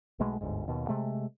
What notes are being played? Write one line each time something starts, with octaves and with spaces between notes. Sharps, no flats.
B1 B2 G#3 A3
G1 D2 G#2
D#2 B2
C3 G#3 A3